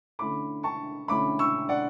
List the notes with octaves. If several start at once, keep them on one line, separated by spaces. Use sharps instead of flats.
D3 A3 C#4 E4 B5 D6
A5 C#6
D3 A3 C#4 E4 B5 D6
C#6 E6
D5 F#5